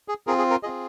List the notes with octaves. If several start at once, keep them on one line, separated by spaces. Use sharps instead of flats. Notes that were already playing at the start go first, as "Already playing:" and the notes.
G#4
C4 F4 G#4 A#4
G#4
A#4
C4 F4 G#4 D#5